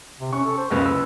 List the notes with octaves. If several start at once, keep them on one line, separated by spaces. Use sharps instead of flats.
C3
C#4 C#6
A4
C5
F#1 C#2 B4
E6